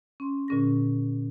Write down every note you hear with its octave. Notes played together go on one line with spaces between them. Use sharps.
C#4 C6
A#2 D3 C#4 G#4 A#6